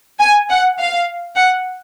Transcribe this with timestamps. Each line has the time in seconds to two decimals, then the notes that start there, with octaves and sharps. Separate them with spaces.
0.20 G#5
0.50 F#5
0.79 F5
1.36 F#5